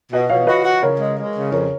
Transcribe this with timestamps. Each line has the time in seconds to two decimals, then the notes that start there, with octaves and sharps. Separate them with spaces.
0.12 B2 D#5 F#5
0.30 B2 C#5 F5
0.47 F#4 B4 D#5
0.64 F#4
0.82 C#3 A#4 C#5
0.99 G#3
1.18 G#3
1.35 C#3
1.52 F2 A#4 C#5